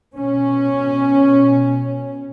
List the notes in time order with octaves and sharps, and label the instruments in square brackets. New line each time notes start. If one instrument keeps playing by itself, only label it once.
[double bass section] B2 C#4